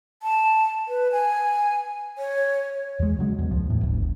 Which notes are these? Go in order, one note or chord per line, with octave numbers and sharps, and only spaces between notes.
A5
B4
G#5
C#5
E2 G#3
C#3 F#3 G#3
E2
C#2 G2 F3
E2 A2
G1 D2